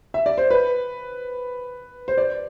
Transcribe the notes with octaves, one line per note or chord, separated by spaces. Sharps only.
E5
D5
C5
B4
C5
D5